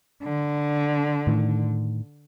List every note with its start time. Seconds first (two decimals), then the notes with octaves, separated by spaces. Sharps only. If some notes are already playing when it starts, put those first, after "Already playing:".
0.23 D3
1.27 A2 D#3